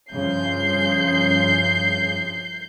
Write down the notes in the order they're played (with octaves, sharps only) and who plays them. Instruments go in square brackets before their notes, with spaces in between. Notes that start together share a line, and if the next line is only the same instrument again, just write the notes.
[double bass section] G2 C#3 F3 [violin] G6 C7